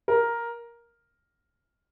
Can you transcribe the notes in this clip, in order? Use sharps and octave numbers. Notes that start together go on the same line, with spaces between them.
A#4